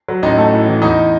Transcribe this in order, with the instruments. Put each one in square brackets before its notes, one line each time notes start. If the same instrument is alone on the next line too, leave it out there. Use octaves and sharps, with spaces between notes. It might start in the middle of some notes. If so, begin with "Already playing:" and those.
[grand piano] F#3
A1 D#4 D#5
A3
A2
E3
E2 D#4 D#5